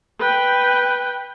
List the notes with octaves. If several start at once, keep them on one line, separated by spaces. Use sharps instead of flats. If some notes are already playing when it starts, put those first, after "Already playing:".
B4 G5